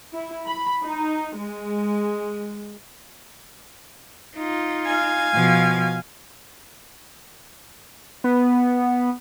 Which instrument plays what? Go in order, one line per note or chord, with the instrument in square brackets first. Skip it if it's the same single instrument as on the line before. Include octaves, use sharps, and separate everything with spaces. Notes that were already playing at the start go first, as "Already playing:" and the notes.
[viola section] E4
B5
D#4
G#3
[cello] D#4 F4
[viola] F5 G#5
[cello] B2 F3
[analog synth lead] B3